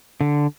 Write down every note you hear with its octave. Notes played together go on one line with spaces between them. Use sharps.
D3